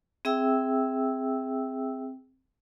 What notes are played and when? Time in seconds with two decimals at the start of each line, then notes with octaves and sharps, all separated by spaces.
0.25 C4 G#4 E5 G5 E6